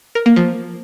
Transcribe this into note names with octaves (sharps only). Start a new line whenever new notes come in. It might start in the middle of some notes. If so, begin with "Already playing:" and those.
A#4
A#3
F3